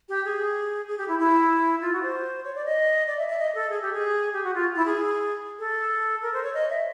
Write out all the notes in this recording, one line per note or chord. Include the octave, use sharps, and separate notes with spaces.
G4
G#4
G#4
G4
E4
E4
F4
F#4
C5
C#5
D5
D#5
D5
E5
E5
D#5
A4
G#4
G4
G#4
G4
F#4
F4
E4
G#4
A4
A#4
C5
C#5
D#5
E5